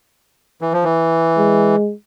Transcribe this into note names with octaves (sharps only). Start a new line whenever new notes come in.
E3
F3
E3
G#3